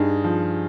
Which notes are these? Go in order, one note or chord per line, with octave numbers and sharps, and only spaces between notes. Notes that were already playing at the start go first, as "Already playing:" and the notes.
Already playing: G2 D#4 G#4
F3